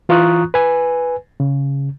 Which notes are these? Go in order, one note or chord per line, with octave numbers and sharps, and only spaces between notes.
E3 F4 A#5 C#6 D#6 F#6
B4 G#5
C#3